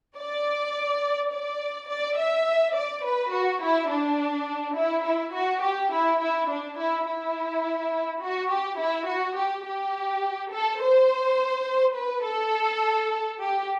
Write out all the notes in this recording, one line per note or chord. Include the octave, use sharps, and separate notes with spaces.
D5
D5
D5
E5
D5
B4
F#4
E4
D4
E4
E4
F#4
G4
E4
E4
D4
E4
E4
F#4
G4
E4
F#4
G4
G4
A4
C5
B4
A4
G4